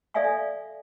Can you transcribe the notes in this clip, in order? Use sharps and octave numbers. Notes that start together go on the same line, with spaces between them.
A4 D5 E5 F5 G#5 C#6